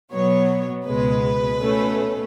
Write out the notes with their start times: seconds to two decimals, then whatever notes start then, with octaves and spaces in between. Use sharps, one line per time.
0.12 B2 F#3 B3 C#5
0.86 C#2 B2 G#3 B4
1.61 B2 A3 C#4